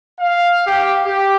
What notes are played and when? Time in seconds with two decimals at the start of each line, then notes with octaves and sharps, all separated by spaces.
0.19 F5
0.67 G4
1.04 G4